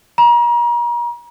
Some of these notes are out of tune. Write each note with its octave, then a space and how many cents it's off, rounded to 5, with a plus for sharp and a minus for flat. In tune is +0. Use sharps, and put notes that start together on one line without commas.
A#5 +35